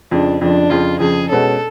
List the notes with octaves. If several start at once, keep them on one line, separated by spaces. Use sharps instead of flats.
F2 C#3 F3 D4
F2 C#3 F3 D4
F2 C#3 F3 F4
F2 C#3 F3 G#4
B2 G#3 C#4 A4